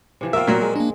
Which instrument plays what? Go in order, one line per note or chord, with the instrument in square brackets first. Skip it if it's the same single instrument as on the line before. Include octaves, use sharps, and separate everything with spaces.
[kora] C3 E3 F3
[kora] A#3 C4 [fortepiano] F4 E5 [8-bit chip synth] A#4
[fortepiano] A#2 F#3
[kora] G#3
[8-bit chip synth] A#3 D4